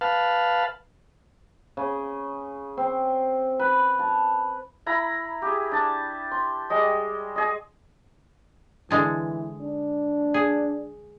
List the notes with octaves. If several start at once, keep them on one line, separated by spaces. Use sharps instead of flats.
B4 F5 A5
C#3
C4
B4
A5
E4 A#5 B5
G4 G#4
D4 A5
C6
G3 G#3 D#5
G#4 D#5
D3 E3 G#3 A5
D4
G#4